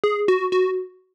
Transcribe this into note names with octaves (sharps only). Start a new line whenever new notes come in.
G#4
F#4
F#4